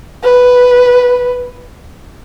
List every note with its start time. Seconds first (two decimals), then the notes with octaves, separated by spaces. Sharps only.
0.24 B4